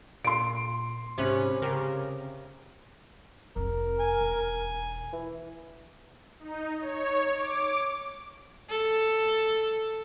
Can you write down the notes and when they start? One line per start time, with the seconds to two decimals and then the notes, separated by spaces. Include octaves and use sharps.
0.25 A#2 C6 D7
1.18 G#2 C3 C#4 B5 F#6
1.62 C#3 G4 A#4
3.56 F1 E4 A#4
4.00 G#5
4.21 E1
5.13 E3
6.39 D#4
6.79 C#5
7.35 D6
8.70 A4